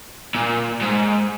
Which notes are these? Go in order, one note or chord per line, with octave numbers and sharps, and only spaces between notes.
A#2
G#2